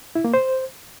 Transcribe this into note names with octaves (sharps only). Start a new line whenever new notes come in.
E4
A#3
C5